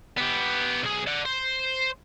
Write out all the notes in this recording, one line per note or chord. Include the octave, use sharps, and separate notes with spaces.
B3 G4
B1 G#4
D5 F#5
C5